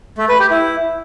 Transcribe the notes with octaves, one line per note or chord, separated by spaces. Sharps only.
A3
B4
G4
E4